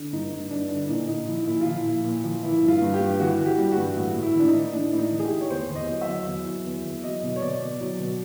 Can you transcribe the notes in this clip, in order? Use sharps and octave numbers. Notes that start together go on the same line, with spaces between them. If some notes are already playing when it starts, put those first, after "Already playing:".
Already playing: D3
G2 D#4
G2
G2 D4
D3 D4
E4
A#2 D#4
A#2 D#4
F3 E4
A#2 E4
F4
F3 E4
A#2
A#2
F3
E3 E4
G2
F4
G2
G4
G2
E3 F#4
E3
G4
G3
F#4
G2
A2
A2
E4
E3 D4
D#4
E3
A2 D4
A2 E4
D#4
E3
G#4
G4
A2
C#5
E2 C5
E2
D#5
F#3
E5
F#3
E2
F#3
E2
E2
F#3 D#5
B2
C#5
B2 D5
B2
F#3
B2